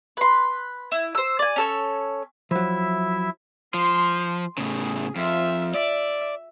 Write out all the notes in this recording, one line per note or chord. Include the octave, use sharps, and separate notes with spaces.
B4 C6
E4
C5 E6
D5 G#5
C#4 A4 C#5
F3 F#3 E4 E5
F3 C6
A2 C#3 G#4
F2 F4 E5
D5 E5